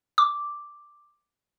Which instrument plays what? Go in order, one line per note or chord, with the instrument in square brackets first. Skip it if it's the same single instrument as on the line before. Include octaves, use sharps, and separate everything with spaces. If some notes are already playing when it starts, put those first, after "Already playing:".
[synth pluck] D6